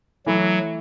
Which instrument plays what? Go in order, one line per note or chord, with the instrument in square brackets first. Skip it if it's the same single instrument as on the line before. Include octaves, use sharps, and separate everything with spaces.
[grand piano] E3 A3 E4 [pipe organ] F#3